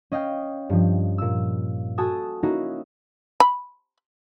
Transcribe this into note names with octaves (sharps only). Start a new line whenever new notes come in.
C#4 D#5 F5 G5
G2 F3
A#2 E6
F#4 A4 G#5 A5 D#6
A#3 C#4 D#4 E4 F#4
B5